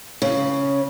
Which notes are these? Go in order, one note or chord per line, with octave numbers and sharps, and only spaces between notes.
C#3